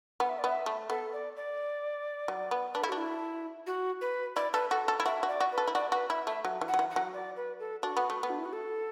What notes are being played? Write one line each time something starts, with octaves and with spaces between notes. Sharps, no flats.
B3 F#5
E5
D5
B3 E5
A3
B3 A4
D5
D5
F#3
B3
D4 B4
E4 A4
D4 F#4
E4
F#4
B4
E4 D5
A4 B4
F#4 A4
A4
E4
F#4 E5
F#4
D5
F#4
B4
A4
E4
F#4 D5
F#4 B4
E4 E5
A3 E5
F#3
E3
F#5
F#3
E3
F#5
F#3
D5
B4
A4
D4 F#4
B3
A3
B3
D4
E4
F#4
A4